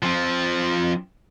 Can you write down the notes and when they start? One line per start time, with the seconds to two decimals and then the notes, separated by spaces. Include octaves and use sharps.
0.03 F3 C4